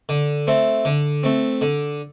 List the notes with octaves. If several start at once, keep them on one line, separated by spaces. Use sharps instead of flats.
D3
A3 C4
D3
A3 C4
D3